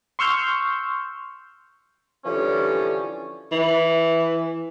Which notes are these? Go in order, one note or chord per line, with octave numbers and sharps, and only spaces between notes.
C6 C#6 E6 F6 G6
D3 E3 F3 G3 C#4
E3